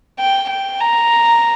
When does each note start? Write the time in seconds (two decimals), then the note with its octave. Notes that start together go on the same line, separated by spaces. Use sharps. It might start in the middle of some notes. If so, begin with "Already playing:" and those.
0.20 G5
0.49 G5
0.81 A#5